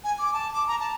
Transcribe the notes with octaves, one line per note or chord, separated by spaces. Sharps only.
G#5
D6
A5
D6
A#5
A5